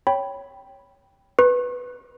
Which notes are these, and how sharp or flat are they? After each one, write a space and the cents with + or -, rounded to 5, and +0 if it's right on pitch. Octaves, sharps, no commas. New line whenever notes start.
C#5 +0 G5 +0 B5 +0
B4 +0 C#6 -40